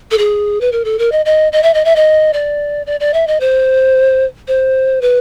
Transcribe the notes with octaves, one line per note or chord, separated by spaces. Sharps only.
A4
G#4
B4
A#4
A4
A#4
D#5
D#5
D#5
E5
D#5
E5
D#5
D5
D5
D5
E5
D#5
C5
C5
B4